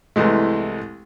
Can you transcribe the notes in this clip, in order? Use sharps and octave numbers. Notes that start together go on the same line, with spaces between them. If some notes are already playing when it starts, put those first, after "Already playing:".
C2 E3 G#3 A3